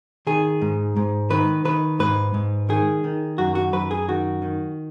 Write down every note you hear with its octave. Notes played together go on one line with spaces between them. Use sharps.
D#3 G#4
G#2
G#2
D#3 B4
D#3 B4
G#2 B4
G#2
D#3 G#4
D#3
F#2 F#4
F#4
F#2 B4
G#4
D#3 F#4
D#3